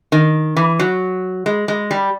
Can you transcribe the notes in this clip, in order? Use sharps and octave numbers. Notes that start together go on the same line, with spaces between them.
D#3
E3
F#3
G#3
G#3
G3